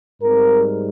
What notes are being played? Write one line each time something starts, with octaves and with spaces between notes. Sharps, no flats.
G#2 G3 C4 A#4